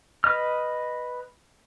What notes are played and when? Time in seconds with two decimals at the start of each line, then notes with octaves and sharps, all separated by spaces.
0.24 B4 D#5 F6